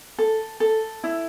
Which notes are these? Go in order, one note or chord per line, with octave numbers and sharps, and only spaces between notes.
A4
A4
E4